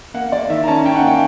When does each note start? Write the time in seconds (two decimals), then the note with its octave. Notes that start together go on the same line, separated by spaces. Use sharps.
0.14 A#3 F#5
0.32 A#3 D5
0.50 D#3 E5
0.64 A#5
0.68 C#4 A5
0.85 C#4 G5
0.96 F#5
1.02 A#3
1.07 G5